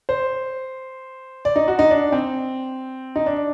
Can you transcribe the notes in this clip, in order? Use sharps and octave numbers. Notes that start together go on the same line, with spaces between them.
C5
D5
D#4
F#4
D#4
D4
C4
D#4
D4